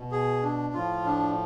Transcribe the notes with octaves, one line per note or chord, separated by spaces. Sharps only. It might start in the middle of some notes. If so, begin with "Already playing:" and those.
Already playing: B2
G#4
D4
A2 F3 F4
D4